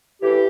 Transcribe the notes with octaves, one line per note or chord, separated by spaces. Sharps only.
A2 E3 G4